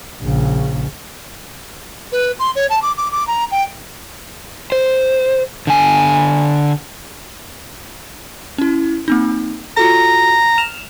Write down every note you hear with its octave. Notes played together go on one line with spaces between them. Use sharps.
A#1 C#3
B4
C6
C#5
A5
D6
D6
D6
A#5
G5
C5
D3 G#5
C#4 E4
A#3 C4 D#4
F4 F#4 A4 A#5
F6 E7 F7